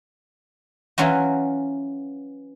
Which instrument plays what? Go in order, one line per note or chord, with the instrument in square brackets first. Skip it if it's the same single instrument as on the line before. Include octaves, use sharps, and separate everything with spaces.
[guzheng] E3 F#3 C#4 F4 F#4